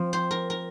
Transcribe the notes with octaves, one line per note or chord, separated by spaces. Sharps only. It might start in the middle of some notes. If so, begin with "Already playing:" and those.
Already playing: F3 C4
C5
A#4
A#4